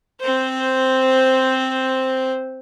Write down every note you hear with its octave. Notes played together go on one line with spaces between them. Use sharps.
C4 C5